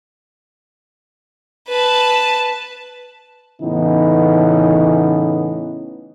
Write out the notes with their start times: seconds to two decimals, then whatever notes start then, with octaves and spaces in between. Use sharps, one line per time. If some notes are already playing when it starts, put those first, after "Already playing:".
1.68 B4 A5
3.62 A2 C#3 E3 B3 C#4 D#4